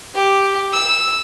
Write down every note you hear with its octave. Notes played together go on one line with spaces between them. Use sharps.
G4
E6